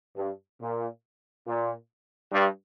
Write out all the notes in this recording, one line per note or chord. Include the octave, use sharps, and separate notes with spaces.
G2
A#2
A#2
G2